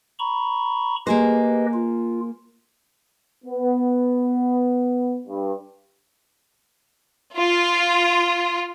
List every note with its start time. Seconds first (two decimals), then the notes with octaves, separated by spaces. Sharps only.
0.19 A#5 B5 C#6
1.07 A#3 G4 G#4 B4 C5 D#5
1.74 F4
3.45 B3
5.28 G2
7.37 F4